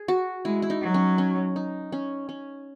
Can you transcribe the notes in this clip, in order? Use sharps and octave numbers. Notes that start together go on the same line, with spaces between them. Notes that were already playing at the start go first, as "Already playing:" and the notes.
Already playing: G#4
F#4
G#3 E4
E4
D#4
F#3
C#4
C#4
D#4
C#4
C#4